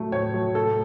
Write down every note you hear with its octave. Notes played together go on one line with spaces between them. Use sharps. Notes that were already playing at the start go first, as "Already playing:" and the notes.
Already playing: A2 F#3 A3
A2 C#5
F#3 A3
A2 A4